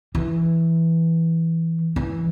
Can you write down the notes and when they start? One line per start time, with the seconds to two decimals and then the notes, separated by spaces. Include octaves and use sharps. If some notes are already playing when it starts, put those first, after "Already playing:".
0.15 E3
1.96 E3